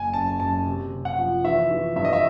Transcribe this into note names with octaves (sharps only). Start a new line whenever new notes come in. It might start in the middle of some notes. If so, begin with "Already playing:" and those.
Already playing: F#1 G#5
F#2 A5
F#2 A5
C3
C3
F#5
F3
E3 E5
E3
G2 E5
D#5
E5